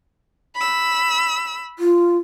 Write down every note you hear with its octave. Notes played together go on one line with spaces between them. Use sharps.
B5 E6
F4